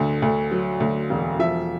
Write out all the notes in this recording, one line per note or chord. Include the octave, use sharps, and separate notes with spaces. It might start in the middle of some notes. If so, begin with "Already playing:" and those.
Already playing: D2 D3
D2
F#3
D2
E1
F3 E5